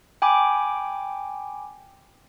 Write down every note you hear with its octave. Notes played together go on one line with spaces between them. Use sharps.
G5 G#5 B5 D6